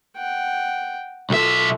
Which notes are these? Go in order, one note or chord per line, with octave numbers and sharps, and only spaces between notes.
F#5 G5
B1 F4 A4 E5